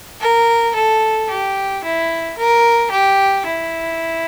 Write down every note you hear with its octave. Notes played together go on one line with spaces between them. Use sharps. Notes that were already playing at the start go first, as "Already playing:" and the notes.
A#4
A4
G4
E4
A#4
G4
E4